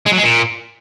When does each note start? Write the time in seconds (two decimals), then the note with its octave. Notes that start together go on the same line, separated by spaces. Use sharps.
0.06 G#3
0.12 F#3
0.18 G#3
0.24 A#2